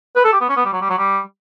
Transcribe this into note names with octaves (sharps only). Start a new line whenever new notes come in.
B4
A4
G4
B3
C#4
B3
G3
F#3
G3
F#3
G3